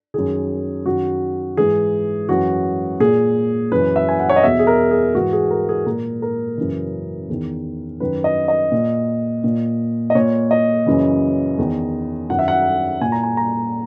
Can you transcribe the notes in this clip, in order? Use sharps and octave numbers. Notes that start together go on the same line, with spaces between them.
F#2 D#3 G#4
F#2 D#3 F#4
G#2 E3 G#4
F#2 E3 F#4
A#2 G#4
F#2 E3 B4
E5
G#5
F#5
C#5
D#5
E2 B2 E5
G#4
A#4
G#4
G#2 E3 F#4
G#4
A#4
G#4
A#2 A#4
A#4
F#2 C#3 E3
E2 D#3
F#2 D#3 B4
D#5
D#5
A#2
A#2
D#5
A#2 C#5
D#5
F#2 C#3 E3
E2 D#3
F#2 D#3 F#5
E5
F#5
A#2 G#5
A#5
G#5
A#5